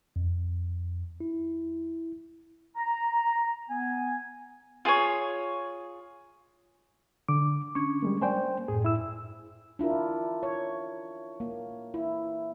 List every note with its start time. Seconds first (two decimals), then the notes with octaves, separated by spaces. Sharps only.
0.16 F2
1.20 E4
2.75 A#5
3.69 B3 G#5
4.85 F4 G#4 C5 C#5
7.28 D3 D6
7.75 C#4 D4 C#6 G#6
8.02 G3 G#3 A#3
8.21 A#3 C5 D5 G5 G#5
8.68 F#2 A2 G#4
8.85 E4 E6
9.79 D4 E4 F4 A#4
10.43 C#5
11.40 A#3
11.94 E4